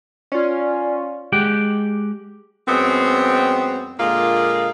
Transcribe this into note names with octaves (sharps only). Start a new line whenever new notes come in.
C#4 F4 D5
G#3 G4 F#5 G5
F#2 G#3 B3 C4
A#2 D3 G#3 A#3 F4